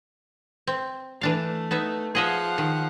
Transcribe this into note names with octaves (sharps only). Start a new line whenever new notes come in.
C4
E3 A3 D4 F5
B3 D#4 E5
F3 G#4 D#5 E5 F#5
D#3